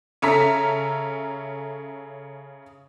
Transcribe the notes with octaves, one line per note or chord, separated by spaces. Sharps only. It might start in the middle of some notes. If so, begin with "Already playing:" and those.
C#3 C#4 A4 E5 A#5 B6